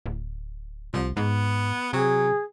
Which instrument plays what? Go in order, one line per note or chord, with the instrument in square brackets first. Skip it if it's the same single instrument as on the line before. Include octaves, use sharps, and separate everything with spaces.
[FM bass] D1
[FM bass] C2 [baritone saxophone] F3
[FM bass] G#2 [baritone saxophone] B3
[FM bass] C3 [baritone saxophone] F#3 [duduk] G#4